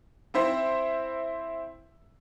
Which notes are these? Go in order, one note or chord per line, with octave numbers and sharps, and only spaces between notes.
C4 E4 C5 E5